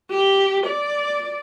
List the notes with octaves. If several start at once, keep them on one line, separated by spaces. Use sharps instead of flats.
G4
D5